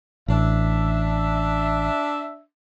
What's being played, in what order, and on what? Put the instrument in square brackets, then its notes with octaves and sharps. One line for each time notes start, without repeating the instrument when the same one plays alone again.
[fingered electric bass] A1 [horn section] D4 E5